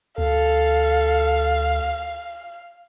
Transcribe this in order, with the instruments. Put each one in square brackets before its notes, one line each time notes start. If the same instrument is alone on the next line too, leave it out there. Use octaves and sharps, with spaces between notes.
[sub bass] D2 [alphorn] A4 [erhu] F5